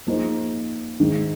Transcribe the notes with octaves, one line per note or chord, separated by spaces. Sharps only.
F3 A#3 D#4 G#4 C5
G#2 D#3 G#3